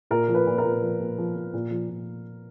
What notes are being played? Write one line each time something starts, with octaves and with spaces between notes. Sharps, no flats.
A#2 A#4
F3
B4
A#2
A#4
A#2
F3
A#2
F3
F3
A#2
F3
A#2